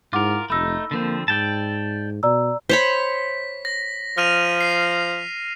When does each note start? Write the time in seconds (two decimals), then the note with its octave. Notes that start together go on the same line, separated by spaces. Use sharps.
0.13 G#2 E4 F4 A#4 F#5 D6
0.50 F1 A3 D#4 B5 E6
0.91 D3 F3 A#3 C4
1.28 G#2 D5 G5 A5
2.23 B2 D5 A#5 E6
2.69 C5 C#5 B5 B6
3.65 A#6
4.18 F3 F6 D#7 F7
4.60 C7